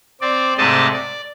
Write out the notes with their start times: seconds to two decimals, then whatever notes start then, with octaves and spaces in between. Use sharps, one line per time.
0.21 C4 D5
0.58 G#2 C3 A3 D5 D#5 A5
0.94 D5